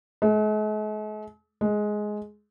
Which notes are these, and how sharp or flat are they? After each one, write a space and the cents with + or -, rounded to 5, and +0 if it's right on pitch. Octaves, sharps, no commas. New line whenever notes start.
G#3 +45
G#3 +10